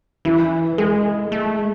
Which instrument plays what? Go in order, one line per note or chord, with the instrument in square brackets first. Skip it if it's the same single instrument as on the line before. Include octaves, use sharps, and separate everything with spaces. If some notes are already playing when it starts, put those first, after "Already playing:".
[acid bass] E3 [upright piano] E4
[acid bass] G#3 [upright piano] G#4
[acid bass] A3
G#3